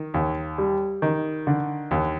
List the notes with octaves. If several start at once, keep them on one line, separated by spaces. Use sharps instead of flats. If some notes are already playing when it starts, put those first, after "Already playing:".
Already playing: D#3
D#2
G3
D#3
D3
D#2